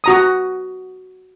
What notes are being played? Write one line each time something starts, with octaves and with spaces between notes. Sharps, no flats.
F#4 A#5 D#6